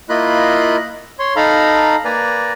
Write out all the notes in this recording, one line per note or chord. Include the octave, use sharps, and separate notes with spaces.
A#3 E4 F4 D#5 B5 F#6
C#5 C6
D#4 A4 F5 A#5 B5
A#3 B4 D5 G#5 A#5